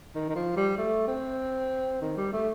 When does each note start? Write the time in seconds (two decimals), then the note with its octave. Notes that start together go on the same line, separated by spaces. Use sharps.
0.15 D#3
0.29 D#3
0.35 F3
0.57 G3
0.77 A3
1.08 C4
2.01 D#3
2.17 G3
2.33 A3